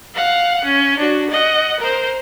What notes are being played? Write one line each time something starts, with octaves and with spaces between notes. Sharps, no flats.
F5 F#5
C#4
D4 F#4
D#5 F#5
A#4 C5